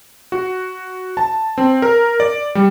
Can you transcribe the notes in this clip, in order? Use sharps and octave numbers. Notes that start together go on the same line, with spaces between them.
F#4
A5
C4
A#4
D5
G3